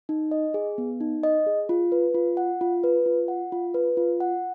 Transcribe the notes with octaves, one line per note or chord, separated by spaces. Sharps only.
D#4
D#5
G#4
B3
D#4
D#5
G#4
F4
B4
F4
F#5
F4
B4
F4
F#5
F4
B4
F4
F#5